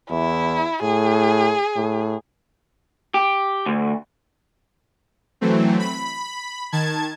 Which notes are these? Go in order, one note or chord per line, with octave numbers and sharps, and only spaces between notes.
E2 E4
A2 G#4
A2
G4
D2
E3 F#3 A3 C4
B5
D#3 A5 G#6